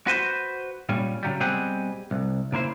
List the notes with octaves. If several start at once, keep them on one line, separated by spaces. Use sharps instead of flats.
F#4 B4 C5
A#2 G3 C#4
C#3 F#3 G3
B2 G3 C4 G4 G#4 F#5
C2
C#3 A#3 E4 C5